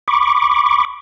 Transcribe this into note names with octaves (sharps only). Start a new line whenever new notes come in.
B5 C#6 D6